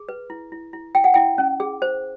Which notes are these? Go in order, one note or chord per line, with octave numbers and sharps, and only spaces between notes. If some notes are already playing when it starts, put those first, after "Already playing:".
Already playing: G#4
B4
E4
E4
E4
E4 G5
F#5
E4 G5
C#4
G#4
C5